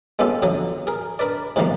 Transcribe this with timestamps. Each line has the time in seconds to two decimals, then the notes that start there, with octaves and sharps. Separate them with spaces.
0.19 G#3 B3 C#4 F4 G4 A4
0.42 F2 D3 F#3 D#6
0.87 G#4 A#4
1.19 D4 A#4 B4 D5
1.56 G#2 C3 D#3 F3 G3 A#3